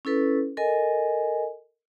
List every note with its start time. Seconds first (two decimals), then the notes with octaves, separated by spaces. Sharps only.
0.05 C#4 E4 A4 B4
0.57 A4 A#4 D#5 G#5